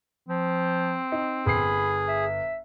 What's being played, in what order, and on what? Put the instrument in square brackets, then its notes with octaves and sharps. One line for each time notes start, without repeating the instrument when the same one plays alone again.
[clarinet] F3 [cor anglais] C4
[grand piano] D#4
[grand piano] G1 C7 [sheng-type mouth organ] G#4 [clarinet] B5
[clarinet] E5